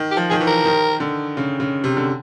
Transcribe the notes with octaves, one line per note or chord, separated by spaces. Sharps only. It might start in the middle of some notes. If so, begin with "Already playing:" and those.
Already playing: D#3
G4
F3
D#3 G#4
E3
A#4
D#3
D3
C#3
C#3
C3
D3